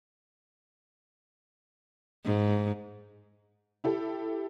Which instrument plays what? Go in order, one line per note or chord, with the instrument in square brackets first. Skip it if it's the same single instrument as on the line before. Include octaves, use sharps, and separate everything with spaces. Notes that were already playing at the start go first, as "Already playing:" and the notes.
[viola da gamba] G#2
[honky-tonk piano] E4 G4 A4